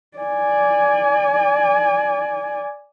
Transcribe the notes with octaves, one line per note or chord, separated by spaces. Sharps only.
D5 G#5